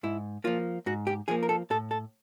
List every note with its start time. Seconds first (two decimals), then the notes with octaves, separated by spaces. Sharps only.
0.03 G#2 E4
0.44 F3 A#3 F4
0.86 G#2 F#4
1.07 G4
1.28 F3 A#3 G#4
1.43 A#4
1.49 A4
1.70 A2 A4
1.91 A4